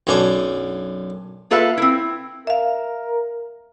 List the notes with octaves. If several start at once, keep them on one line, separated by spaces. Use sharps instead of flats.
B1 F#2 C#4 D4 C#6
A#3 F4 A4 B4 E5 F5
C4 E4
A#4 E5 F5